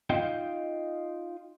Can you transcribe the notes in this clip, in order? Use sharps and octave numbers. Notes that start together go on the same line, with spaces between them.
D#4 F4 D#5 F5 G5